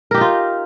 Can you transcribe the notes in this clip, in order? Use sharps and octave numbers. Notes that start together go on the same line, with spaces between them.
D#4 F4 G4 A#4